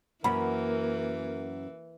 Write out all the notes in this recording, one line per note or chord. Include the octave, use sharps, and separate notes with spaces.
F#2 E3 A#3 B5